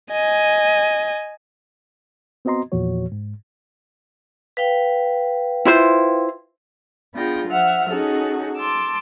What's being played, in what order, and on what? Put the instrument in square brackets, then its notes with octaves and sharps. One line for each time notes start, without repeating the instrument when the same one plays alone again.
[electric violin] D#5 G#5
[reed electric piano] B3 C4 F#4 D#5 A#5 C6
E2 A#2 F3 F#4 C#5
G#2
[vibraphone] B4 F5 G5
[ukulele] E4 F4 C5
[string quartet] B3 D4 F4 G#4 G5 A#6
F3 E5 F#5 F6
C#4 D#4 F#4 G#4 A4
A5 C6 D6 E6